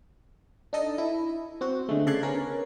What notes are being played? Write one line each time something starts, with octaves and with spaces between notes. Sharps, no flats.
D4 D#4 A4 D#5
E4
C4 F#4
D3 G#3 A3
C#3 A4 D5 C6 F#6 G#6
B3 C#4 A#4